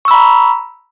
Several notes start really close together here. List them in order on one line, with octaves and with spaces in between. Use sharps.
C#6 E6 B5 A#5